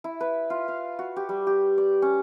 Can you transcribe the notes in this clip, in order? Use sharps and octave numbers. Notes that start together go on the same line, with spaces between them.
E4
B4
F4
F5
F#4
G4
G3
G4
D5
C#4